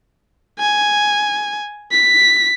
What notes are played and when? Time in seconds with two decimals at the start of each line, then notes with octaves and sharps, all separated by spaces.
0.60 G#5
1.92 B6